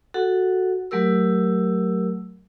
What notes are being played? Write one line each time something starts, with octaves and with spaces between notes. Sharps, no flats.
F#4 A4 F#5
F#3 A3 G4 A#4 E6